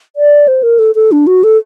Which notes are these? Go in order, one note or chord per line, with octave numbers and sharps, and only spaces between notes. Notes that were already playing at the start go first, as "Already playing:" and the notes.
D5
C5
A#4
A4
A4
D4
F#4
A4